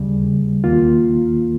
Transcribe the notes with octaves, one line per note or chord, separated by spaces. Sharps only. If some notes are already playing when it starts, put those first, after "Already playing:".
Already playing: D#2 C#3 G3
D#2 D#3 A#3 F4